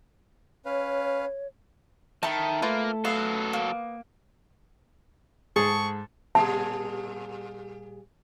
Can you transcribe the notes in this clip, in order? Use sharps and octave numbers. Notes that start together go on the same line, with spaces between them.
C#4 B4 C#5 F5
D#3 E4 A4 A5
A3 A#3 F4 B4
F#3 B3 A4 F5
A#3
G#2 G#4 A4 C#6
A#2 G3 G#4 A5